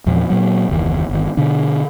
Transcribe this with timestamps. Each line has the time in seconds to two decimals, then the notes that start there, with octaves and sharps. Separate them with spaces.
0.06 E2 A#2 F3 G#3
0.30 A#2 F#3
0.69 F#1 D#2 E3
1.09 G1 D#3
1.37 B2 D3 D4